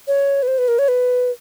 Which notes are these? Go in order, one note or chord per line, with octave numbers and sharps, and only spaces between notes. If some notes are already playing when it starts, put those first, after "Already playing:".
C#5
B4
C5
B4
A#4
C#5
B4